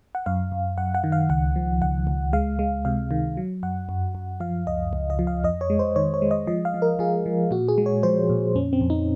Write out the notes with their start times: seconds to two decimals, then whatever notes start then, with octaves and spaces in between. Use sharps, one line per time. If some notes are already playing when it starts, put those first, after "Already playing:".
0.15 F#5
0.26 F#2 F5
0.52 F#2
0.78 F#2 F#5
0.95 F#5
1.04 D#3
1.12 F5
1.29 C#2 F#5
1.56 F3
1.82 C#2 F#5
2.07 C#2
2.33 G#3 F5
2.59 G#3
2.85 C3 F5
3.11 D#3
3.37 F#3
3.63 F#2 F#5
3.89 F#2
4.15 F#2
4.40 F3 F5
4.67 C#2 D#5
4.93 C#2
5.10 D#5
5.19 F3
5.27 F5
5.44 F2 D#5
5.61 C#5
5.70 G#3
5.79 C5
5.96 D#3 C#5
6.14 C#5
6.22 G#3
6.31 D#5
6.47 F3 D#5
6.65 F5
6.74 F3
6.82 A#4
6.99 F3 G#4
7.26 F3
7.51 A#2 F#4
7.69 G#4
7.78 G#3
7.86 C#5
8.03 F3 C5
8.30 A#2
8.55 F2 C#4
8.73 C4
8.81 F2
8.90 D#4